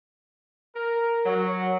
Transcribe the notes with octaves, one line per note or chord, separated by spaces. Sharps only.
A#4
F#3